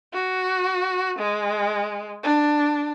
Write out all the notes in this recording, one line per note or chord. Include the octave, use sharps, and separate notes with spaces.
F#4
G#3
D4